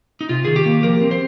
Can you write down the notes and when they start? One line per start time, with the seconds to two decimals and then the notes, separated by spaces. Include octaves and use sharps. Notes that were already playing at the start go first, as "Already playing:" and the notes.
0.21 D#4
0.29 C3 F4
0.45 D#3 G#4
0.56 G4
0.66 A#3
0.83 F3 A#4
1.01 C4
1.11 C5